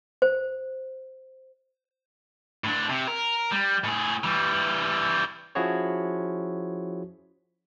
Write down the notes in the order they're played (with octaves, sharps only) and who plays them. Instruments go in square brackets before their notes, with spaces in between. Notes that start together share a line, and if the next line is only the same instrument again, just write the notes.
[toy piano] C5
[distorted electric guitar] A2 D4
C3
A#4
G3
A2 G#4
E3 G3
[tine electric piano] F3 C#4 E4 F#4 G#4 C#5